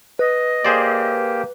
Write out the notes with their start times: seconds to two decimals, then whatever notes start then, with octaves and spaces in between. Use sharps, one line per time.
0.19 B4 D#5
0.65 A#3 G4 G#4 C5 D5